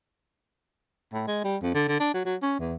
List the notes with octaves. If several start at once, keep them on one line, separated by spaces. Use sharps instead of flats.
A2
G#3
G3
F2
D3
D3
D4
F#3
F#3
C#4
E2